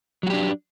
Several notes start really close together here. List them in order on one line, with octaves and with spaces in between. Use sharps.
F#3 F#4 G4 D4